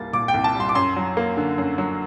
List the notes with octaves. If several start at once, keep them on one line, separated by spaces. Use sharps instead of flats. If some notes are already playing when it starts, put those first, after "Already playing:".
Already playing: C2 G3 A#3 A6
A#2 D6
G5
C2
A5
G3 C6
D6
F#2 C6
F#3
A#3
D3
F#2
F#3